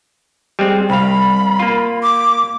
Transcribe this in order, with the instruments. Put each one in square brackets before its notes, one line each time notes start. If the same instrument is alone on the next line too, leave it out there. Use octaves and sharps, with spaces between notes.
[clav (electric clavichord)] G3 G#3 C4
[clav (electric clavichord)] C2 F5 [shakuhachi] B5
[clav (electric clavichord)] A#3 F4
[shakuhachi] D6